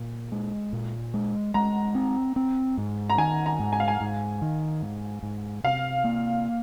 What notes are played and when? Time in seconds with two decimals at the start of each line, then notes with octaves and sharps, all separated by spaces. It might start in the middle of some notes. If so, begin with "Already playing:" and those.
Already playing: A#2
0.32 G#3
0.73 A#2
1.14 G#3
1.54 G#3 A#5
1.95 C4
2.36 C4
2.77 G#2
3.10 A#5
3.18 D#3 G#5
3.46 A#5
3.59 G#2
3.73 G#5
3.80 F5
3.88 G#5
4.01 G#2
4.42 D#3
4.82 G#2
5.23 G#2
5.64 C3 F5
6.04 A#3